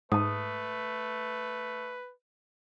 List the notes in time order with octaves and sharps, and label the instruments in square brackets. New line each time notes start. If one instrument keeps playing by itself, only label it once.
[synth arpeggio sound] G#2 [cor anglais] A3 [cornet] B4 [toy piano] A5 D#6